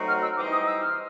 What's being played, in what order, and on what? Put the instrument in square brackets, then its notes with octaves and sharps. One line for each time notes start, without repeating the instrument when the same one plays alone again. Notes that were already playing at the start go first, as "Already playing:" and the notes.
Already playing: [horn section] F#3 A3 C4 D#4 F#4
[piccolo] F6
E6
[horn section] E3 G3 C4 D#4 [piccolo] D6
[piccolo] D#6
E6
F6